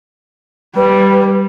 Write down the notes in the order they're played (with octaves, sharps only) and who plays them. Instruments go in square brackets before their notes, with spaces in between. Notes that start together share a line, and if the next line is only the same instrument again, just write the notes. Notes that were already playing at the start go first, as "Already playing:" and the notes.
[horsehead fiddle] G3 [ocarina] B4